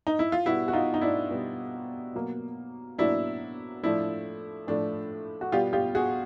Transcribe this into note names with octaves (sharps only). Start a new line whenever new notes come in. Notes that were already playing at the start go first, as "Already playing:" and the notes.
D#4
E4
F4
B2 G3 B3 E4 F#4
F#4
D#4 F4
D#4
D4 E4
B2 G3 B3
B2 F#3 A#3
B2 F#3 A#3 D4 E4
A2 F3 A3 D4 E4
A2 F3 A3 D4
F#4
B2 G3 B3 F4 G4
F4 G4
F#4 G#4